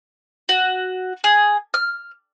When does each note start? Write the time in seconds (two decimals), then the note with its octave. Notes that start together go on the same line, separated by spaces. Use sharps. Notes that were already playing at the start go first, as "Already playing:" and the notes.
0.49 F#4
1.24 G#4
1.74 F6